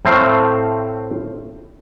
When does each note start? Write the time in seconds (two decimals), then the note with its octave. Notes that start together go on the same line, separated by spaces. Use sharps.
0.05 A2 A3 C4 C5 F5